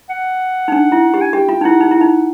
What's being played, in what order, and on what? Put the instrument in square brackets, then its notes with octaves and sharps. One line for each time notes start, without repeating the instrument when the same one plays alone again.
[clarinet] F#5
[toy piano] D#4
D4
E4
G4
[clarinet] G#5
[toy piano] G4 [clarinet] G5
[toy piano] F4
D#4
[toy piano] E4 [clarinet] F#5
[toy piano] D#4
E4
[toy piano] D#4 [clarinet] F#5